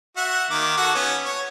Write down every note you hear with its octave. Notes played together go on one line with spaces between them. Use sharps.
F#4 E5 F#5
D#3 A#3 D6
F#4 A4 F#5
B3 C#4
C#5